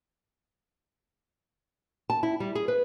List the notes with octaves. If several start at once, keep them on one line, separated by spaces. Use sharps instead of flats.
A5
E4
G3
G#4
B4